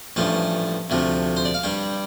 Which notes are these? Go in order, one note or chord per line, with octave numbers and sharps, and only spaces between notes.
A1 G2 F3 A3 A5
D2 C3 F3 A3
C5
D5
F5
G2 G3 G5